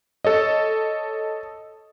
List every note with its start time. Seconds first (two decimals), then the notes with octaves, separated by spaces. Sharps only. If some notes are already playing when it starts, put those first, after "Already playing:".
0.25 A4 C#5 D#5